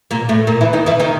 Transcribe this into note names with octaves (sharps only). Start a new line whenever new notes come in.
A#2 A#3
A2 A3
A#2 A#3
E3 E4
D#3 D#4
E3 E4
D#3 D#4